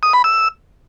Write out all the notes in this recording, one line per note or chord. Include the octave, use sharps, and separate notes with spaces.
D#6
B5
E6